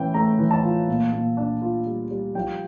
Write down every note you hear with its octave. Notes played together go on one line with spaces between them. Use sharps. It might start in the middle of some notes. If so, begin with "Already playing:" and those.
Already playing: E3 A3 C#4 G5
A3 A#5
E3
A5
F4
A#2
A#2
D4
F4
G3
G3
F3 G5